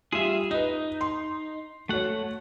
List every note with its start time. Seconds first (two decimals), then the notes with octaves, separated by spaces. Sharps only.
0.12 G3 F4 G#4 E5
0.51 D#4 B4 D#5
1.01 C6
1.89 A3 F#4 C#5 F#5